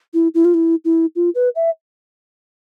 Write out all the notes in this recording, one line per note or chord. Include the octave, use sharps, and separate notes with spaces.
E4
E4
F4
E4
E4
F4
B4
E5